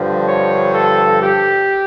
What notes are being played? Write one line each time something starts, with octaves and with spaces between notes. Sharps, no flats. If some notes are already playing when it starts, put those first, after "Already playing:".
Already playing: G2 D3 F3
C#5
A4
G4